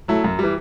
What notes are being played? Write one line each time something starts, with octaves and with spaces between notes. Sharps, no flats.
F#3 A3 E4
F#2
E3 G3